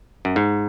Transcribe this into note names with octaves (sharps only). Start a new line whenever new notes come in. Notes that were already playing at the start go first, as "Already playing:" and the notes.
F#2
G#2